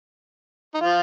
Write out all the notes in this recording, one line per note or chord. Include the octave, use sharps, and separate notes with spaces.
D#4
F3 F4